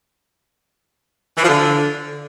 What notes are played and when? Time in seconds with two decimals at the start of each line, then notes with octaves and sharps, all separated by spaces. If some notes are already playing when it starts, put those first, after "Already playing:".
1.37 E3
1.43 F3
1.48 D3